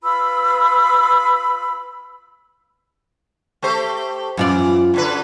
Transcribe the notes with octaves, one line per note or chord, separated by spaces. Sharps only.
F4 B4 B5 E6
A3 G4 C5
F#2 E3 F4 D5
F#2 D3 B4